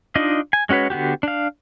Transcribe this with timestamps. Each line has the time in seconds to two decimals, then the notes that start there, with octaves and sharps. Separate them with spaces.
0.15 D4 D#4 F4 D#5
0.53 G#5
0.69 G#3 C#4 F#4 B4 C#5
0.90 D3 B3 F#4 G4
1.23 D4 F5